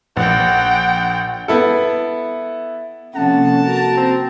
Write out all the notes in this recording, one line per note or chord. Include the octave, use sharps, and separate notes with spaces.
A#1 F#5 G5
B3 E4 A4
C3 F3 A#3 C#4 A4 F#5 A5
F#4 A#4
C4